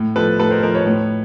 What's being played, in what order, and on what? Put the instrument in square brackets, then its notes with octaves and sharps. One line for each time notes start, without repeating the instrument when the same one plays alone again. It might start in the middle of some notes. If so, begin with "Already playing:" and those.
Already playing: [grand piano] A2
F3 A4 B4
A2 A4 B4
A#4 C5
F3 A#4 C5
B4 C#5
A2